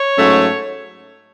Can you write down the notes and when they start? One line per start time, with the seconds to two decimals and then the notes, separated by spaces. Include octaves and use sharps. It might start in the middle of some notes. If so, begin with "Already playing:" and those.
Already playing: C#5
0.17 G#2 F#3 A3 C#4